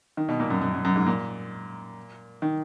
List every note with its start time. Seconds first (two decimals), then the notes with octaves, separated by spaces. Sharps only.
0.17 D#3
0.29 B2
0.40 A#2
0.51 F#2
0.61 F#2
0.74 F#2
0.85 F#2
0.96 G#2
1.07 A#2
2.42 D#3